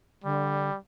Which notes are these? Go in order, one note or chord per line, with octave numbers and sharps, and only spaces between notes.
D3 G3